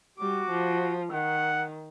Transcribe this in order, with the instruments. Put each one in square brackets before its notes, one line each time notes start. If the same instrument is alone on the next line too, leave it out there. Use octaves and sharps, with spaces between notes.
[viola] G3 D6 [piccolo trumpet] F#4
[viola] F3
[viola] D#3 [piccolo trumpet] F#5